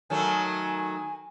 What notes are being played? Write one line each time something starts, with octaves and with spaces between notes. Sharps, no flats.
D#3 F#3 A3 G#5